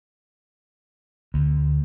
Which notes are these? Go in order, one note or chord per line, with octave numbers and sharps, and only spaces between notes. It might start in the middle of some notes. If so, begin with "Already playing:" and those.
D2